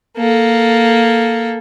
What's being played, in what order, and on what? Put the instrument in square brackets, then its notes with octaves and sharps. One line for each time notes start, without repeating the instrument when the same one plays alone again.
[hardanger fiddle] A#3 A4